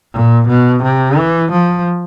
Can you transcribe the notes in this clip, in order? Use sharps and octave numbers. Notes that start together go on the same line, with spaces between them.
A#2
B2
C3
E3
F3